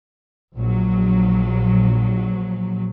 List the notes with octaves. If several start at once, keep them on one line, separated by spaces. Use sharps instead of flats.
A#1 F#3